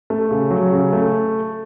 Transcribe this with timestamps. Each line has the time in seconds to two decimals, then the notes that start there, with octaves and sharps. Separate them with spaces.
0.10 A3
0.31 C#3
0.50 F#3
0.72 C#3
0.93 A3